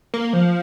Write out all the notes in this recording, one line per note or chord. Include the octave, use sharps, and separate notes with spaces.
A#3
F3